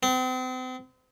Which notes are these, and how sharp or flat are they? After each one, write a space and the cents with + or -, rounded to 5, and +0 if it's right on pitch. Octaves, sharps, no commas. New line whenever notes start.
C4 -40